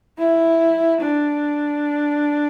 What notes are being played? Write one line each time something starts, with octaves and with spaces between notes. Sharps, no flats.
E4
D4